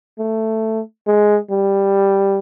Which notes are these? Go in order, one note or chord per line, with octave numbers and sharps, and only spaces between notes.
A3
G#3
G3